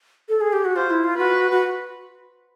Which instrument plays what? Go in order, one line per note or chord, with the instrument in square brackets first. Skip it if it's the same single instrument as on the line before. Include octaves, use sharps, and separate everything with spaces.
[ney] A4
G#4
G4
F#4
[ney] F4 [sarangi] C5
[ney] E4
F4
[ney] F#4 [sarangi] B4
[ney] F#4